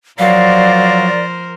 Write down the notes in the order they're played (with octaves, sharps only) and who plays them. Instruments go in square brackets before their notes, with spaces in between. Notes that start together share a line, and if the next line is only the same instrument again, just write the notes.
[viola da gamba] F3 A#4 C5 [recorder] F#3 [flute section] D5 [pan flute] F5